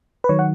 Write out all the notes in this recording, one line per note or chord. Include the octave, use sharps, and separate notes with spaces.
B4
D#3 F#3 C#5
F#5